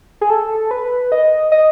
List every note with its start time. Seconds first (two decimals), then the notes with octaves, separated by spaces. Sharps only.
0.21 G#4
0.30 A4
0.71 B4
1.12 D#5
1.52 D#5